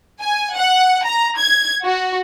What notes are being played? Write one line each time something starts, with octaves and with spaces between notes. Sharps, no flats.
G#5
F#5
A#5
G#6
F#4